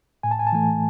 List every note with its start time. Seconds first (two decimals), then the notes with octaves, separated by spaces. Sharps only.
0.23 A2 G#5
0.31 A5
0.39 G#5
0.47 A5
0.52 E3 A3 G#5